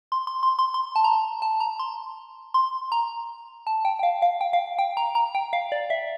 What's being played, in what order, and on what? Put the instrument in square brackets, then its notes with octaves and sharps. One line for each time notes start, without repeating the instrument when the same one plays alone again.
[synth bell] C6
C6
C6
C6
C6
A5
A#5
A5
A#5
C6
C6
A#5
A5
G5
G5
F5
F5
G5
F5
G5
A#5
A#5
G5
F5
D5
E5